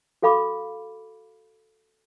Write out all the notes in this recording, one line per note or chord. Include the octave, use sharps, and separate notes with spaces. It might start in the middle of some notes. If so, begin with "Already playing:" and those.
F#4 A4 F5 B5 D6